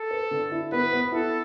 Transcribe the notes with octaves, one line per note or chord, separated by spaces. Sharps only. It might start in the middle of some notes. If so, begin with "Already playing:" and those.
Already playing: A4
B4
D3
E4
B3 B4
B3
E4 A4